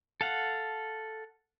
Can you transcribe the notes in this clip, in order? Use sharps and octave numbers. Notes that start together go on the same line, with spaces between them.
A4 F5 F#5